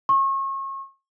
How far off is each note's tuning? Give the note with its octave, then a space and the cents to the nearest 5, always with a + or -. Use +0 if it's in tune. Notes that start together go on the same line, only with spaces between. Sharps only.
C#6 -35